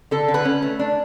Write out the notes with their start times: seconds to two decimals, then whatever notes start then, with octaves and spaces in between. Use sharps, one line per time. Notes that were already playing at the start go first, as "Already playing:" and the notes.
0.11 D3 A4
0.28 D3
0.34 B4
0.45 C#4
0.62 A3
0.79 D4